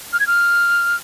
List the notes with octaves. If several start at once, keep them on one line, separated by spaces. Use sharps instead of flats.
F6
G#6
F6